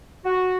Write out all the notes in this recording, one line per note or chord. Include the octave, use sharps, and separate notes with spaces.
F#4